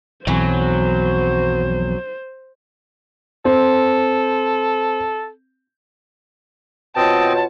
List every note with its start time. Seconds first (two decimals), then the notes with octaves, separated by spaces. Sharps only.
0.27 B1 F2 E3 F#3 C5
3.45 C4 A4
6.96 B2 C4 F4 C#5 D#5 F#5 G5 A5